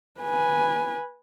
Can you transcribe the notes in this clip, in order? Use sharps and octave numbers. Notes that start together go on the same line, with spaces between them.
B4 G#5